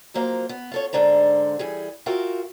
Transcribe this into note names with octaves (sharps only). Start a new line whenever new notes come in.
F2 F#3 A#3 C5 F5
B3
F4 A4 C#5
G#2 D3 D4 C5 A#5
E3 G3 G#4
F4 F#4 A#4 E5 F5 G5